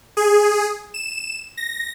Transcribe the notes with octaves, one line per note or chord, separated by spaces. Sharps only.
G#4
E7
A#6